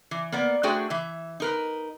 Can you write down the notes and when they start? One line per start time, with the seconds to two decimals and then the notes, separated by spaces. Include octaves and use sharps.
0.11 E3
0.32 A#3 B3 D5
0.63 A3 D4 F#4 G#4 C5 G5
0.90 E3 E5
1.40 D#4 A#4 B4